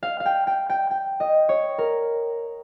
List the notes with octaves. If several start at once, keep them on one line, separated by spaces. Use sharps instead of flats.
F5
F5
G5
G5
G5
G5
D#5
C#5
A#4